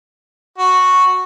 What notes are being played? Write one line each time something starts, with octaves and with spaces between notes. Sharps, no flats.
F#4